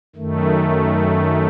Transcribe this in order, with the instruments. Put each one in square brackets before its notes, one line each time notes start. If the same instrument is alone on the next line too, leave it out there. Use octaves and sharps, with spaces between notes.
[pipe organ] F#2 D#3 A3